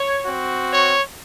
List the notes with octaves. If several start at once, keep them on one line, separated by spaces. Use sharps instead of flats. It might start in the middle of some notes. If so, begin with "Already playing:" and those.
Already playing: C#5
C4 F#4
C#5